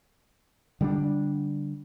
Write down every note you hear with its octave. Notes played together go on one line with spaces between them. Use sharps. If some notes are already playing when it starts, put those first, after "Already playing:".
D3 G3 A#3 D4